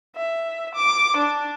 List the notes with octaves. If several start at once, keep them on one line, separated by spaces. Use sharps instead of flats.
E5
D6
D4